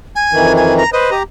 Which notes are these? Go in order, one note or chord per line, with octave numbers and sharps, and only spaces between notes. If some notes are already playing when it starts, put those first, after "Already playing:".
G#5
F2 D#3 E3
G#5
A#5
B4 C5 D#5
G4 A#5